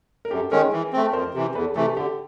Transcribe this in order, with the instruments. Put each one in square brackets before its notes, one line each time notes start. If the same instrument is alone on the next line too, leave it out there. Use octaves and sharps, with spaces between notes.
[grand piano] A#4
[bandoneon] F#2 [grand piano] G4 A4
[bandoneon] D#3 G#3 C#4 [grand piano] G#4 A#4
[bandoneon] E3
A3 C4
[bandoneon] F2 [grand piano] A#4 C5
[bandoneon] C3 E3
[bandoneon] E2 [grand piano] A4 B4
[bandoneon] C3 E3 A3 [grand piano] G4 A4
[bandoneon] D3 [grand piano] G4 A4